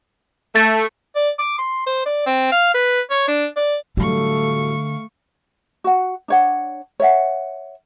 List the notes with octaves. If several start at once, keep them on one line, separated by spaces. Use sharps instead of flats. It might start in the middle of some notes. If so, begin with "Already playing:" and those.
A3 A6
D5
D6
C6
C5
D5
C4
F5
B4
C#5
D4
D5
A2 D3 F#3 G3 A3 F5 C#6
F#4 F#5
D4 C#5 F#5
C#5 E5 F#5